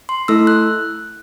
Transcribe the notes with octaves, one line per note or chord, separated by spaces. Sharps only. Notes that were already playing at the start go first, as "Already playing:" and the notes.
C6
A3 E4 A4 E6
F#6